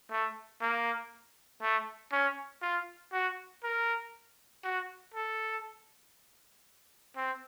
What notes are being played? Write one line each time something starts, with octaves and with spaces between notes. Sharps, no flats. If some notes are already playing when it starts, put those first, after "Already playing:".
A3
A#3
A3
C#4
F4
F#4
A#4
F#4
A4
C4